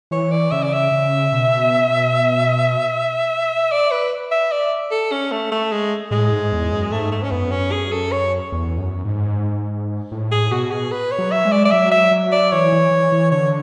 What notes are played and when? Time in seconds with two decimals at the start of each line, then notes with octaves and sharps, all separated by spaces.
0.11 E3 C#5
0.31 D5
0.51 C#3 E5
0.63 D5
0.73 E5
0.92 C#3
1.32 B2
3.71 D5
3.91 B4
4.31 E5
4.52 D5
4.91 A4
5.11 C#4
5.31 A3
5.51 A3
5.72 G#3
6.11 A2 G#3
6.32 G#2
6.52 E2
6.72 F#2
6.92 G#2 A3
7.12 A3
7.23 C#4
7.31 F#2 B3
7.51 C#4
7.72 G#4
7.92 A4
8.12 C#5
8.52 E2
8.78 F#2
9.05 G#2
10.12 A2
10.31 G#4
10.51 B2 F#4
10.71 G#4
10.92 B4
11.11 C#5
11.19 F#3
11.32 E5
11.45 G#3
11.52 D5
11.65 D5
11.71 F#3 E5
11.92 E5
12.11 F#3
12.32 D5
12.51 E3 C#5
12.72 E3
12.91 E3
13.12 E3
13.31 D3 C#5